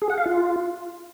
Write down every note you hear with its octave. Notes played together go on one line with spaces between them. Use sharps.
G#4
F#5
F5
F4